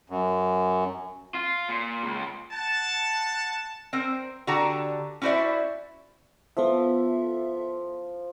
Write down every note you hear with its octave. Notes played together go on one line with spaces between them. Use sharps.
F#2
F4
A#2
C#2
F#5 A5
C4 A#4 C5
D3 F#4 G4 A5 A#5
C#4 E4 F#4 C5 D5 E5
F3 B3 A4 E5